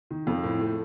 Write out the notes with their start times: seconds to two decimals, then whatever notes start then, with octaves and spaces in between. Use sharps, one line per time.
0.11 D#3
0.27 F2
0.44 A2
0.61 A3